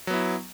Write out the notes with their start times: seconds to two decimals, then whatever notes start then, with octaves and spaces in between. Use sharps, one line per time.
0.07 F#3
0.10 B3
0.13 E4